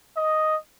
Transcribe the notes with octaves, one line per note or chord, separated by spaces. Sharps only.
D#5